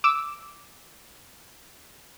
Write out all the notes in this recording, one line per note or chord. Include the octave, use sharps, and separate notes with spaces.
D6 E6